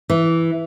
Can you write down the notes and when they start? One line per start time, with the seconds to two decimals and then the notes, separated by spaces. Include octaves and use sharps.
0.10 E3